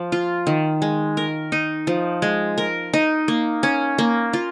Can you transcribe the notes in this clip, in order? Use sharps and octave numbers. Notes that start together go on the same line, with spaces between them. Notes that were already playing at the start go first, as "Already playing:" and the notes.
Already playing: F3
F4
D#3
G#3
A#4
D#4
F3
G#3
A#4
D#4
A#3
C#4
A#3
F4